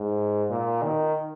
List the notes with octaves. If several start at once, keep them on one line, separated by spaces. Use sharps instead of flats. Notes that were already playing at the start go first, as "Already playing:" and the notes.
Already playing: G#2
A#2
D#3